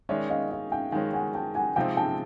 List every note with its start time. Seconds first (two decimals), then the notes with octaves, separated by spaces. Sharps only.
0.09 D#3 G#3 C#4 D5 E5
0.30 D#5 F5
0.51 D#5 F5
0.72 F5 G5
0.92 D#3 G#3 C#4 F5 G5
1.13 F#5 G#5
1.35 G5 A5
1.55 F#5 G#5
1.76 C3 F3 G#3 C4 D#4 F5 G5
1.97 G5 A5